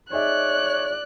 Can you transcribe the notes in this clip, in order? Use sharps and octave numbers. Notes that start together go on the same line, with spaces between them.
D#4 G#4 C#5 D5 E5 F#6